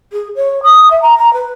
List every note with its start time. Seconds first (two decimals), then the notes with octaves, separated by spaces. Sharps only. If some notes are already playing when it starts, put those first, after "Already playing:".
0.13 G#4
0.36 C#5
0.63 D#6
0.90 E5
1.02 A#5
1.18 A#5
1.33 B4